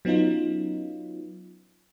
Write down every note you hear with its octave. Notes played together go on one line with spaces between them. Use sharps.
F#3 B3 C#4 D#4 F4